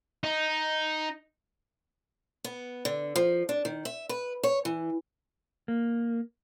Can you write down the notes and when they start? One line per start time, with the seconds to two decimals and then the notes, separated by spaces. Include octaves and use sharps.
0.24 D#4
2.44 B3
2.85 D3
3.16 F3
3.49 D4
3.65 D#3
3.85 E5
4.09 B4
4.43 C#5
4.65 E3
5.68 A#3